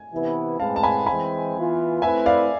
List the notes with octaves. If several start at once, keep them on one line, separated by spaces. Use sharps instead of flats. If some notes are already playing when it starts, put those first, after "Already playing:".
Already playing: G#5
C3 E3 B3 E4 B4
A2 G#3 C4 G#4 B4 F5 A5
A5
G#5 B5
E3 G#3 C4 G#5 B5
E3 B3 F4
A3 C4 E4 B4 E5 G#5
D5 F5